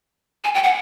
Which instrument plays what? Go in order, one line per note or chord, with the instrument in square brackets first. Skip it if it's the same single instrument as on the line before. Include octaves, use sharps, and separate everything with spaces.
[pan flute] G#5
G5
F#5